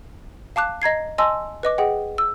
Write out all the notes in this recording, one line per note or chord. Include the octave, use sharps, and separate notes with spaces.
F5 A5 D6 F#6
D#5 A#5 G#6 C7
D#5 G#5 A5 C6 E6
B4 D#5 D6
G#4 D#5 F#5 G5
E6